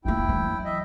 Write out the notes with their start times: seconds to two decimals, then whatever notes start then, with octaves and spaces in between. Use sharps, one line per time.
0.05 F1 A#3 E4 G5
0.29 E3 F#3
0.65 D#5 E5